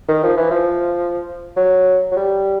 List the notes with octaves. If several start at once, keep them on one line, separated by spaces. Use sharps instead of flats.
D#3
F3
E3
F3
F#3
F#3
G3